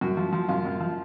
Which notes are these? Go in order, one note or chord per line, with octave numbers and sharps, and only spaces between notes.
F#2 F#4
F3
F3
F#2 F4
F#2
F3